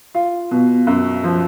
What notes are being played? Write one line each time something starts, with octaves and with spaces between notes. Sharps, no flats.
F4
B2
F#2
F3